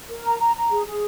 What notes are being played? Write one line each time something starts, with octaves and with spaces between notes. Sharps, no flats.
A#4
A#5
A#5
A#5
G#4
G#4